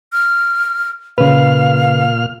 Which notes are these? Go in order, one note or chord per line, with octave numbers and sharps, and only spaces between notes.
F6
A#2 C#3 B4 F5 F6